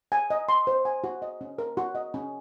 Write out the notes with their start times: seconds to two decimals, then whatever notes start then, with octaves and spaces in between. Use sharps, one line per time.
0.12 G#5
0.30 D#5
0.49 C6
0.67 C5
0.85 G#5
1.04 F#4
1.22 D#5
1.41 C#4
1.58 A#4
1.77 F#4
1.95 D#5
2.14 C#4